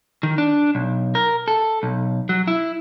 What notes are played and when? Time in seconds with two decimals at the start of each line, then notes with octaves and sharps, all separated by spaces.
0.23 D#3
0.38 D4
0.75 B1
1.15 A#4
1.48 A4
1.83 B1
2.29 F#3
2.48 E4